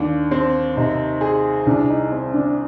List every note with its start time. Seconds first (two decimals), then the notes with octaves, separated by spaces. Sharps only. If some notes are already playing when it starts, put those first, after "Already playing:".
Already playing: D#2 D4
0.31 C4
0.76 C3 D#4
1.21 G#4
1.66 C2 D4
1.89 D#4
2.12 C4
2.34 D4